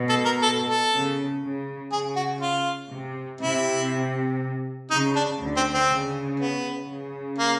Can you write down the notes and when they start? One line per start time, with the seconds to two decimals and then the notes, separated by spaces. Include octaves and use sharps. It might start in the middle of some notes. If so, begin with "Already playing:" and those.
Already playing: B2
0.09 A4
0.25 A#4
0.42 A4
0.68 A4
0.92 C#3
1.42 C#3
1.91 C#3 G#4
2.16 F#4
2.41 F4
2.91 C3
3.41 C3 E4
4.90 C#3 D#4
5.15 D4
5.40 D2 D3
5.57 C4
5.74 C4
5.89 C#3
6.40 B3
6.89 C#3
7.38 A#3